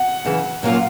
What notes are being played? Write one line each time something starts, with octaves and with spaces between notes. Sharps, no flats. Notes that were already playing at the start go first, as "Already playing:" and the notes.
Already playing: F#5
F#2 C#3 E3
A#2 F#3 A#3 C#4 F4